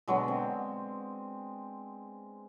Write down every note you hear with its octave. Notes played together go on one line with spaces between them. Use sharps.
B2 D3 F#3 G#3
C4